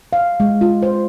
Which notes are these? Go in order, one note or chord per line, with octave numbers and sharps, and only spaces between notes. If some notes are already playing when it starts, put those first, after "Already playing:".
F5
G#3
F4
C5